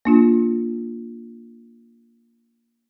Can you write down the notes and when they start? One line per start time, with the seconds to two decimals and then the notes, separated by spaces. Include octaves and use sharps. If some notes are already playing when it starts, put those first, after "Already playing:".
0.05 A#3 D4 F4